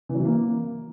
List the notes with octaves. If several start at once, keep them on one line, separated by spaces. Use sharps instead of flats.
E3
F#3
E3
A#3